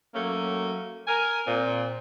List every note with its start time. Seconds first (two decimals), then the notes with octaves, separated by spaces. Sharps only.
0.14 F#3 A3 A#3 C#4
1.07 A#4 G#5
1.46 A#2 C4